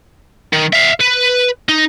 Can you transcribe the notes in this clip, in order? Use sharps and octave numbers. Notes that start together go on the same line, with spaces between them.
D#3
E5 F5
B4
D#4